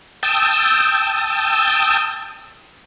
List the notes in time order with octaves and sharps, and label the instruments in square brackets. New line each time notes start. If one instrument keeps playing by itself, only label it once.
[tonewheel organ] G5 A5 D#6 E6